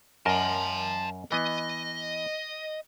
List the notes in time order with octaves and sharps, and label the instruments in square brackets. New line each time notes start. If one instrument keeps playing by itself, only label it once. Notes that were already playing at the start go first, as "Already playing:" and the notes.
[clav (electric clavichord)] F#2 A#4 D#5 [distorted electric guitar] A5 C6
[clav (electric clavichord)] E3 B3 [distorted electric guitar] D#5